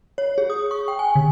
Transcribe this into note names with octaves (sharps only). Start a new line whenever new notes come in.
C#5
G#4
D#6
C#6
G5
G#5
D3